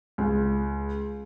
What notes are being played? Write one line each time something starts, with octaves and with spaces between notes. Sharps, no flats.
C#2